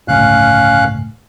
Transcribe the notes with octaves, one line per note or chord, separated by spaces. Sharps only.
G1 C#2 A2 C#4 F5 F#6